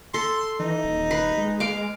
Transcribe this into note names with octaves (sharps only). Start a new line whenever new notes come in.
A4 C6
E3 D#4
D#1
B4
G#3
F5 D6